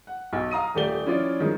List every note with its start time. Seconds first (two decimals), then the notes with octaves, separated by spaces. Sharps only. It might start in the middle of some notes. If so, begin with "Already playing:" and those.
0.07 F#5
0.33 B1
0.51 F5 A#5 D#6 D#7
0.75 D#1 A3 G4 D5 G7
1.06 F3 C#4 E4 F4 D5
1.40 D#3 F3 G3 G#3